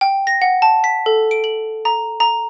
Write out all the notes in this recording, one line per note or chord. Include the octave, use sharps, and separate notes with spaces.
G5
A#6
F#5
A5
B6
A4
D7
F#7
A#5
A#5